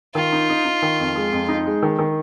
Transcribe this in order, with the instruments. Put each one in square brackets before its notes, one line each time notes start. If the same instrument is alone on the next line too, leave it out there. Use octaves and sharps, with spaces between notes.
[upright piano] D#3 [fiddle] F4
[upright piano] D#4
D#4
D#4
D#3
F2
G#3
F2
D#4
G#3
D#3
D#3